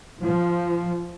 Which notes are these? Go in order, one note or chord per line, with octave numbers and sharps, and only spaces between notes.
F3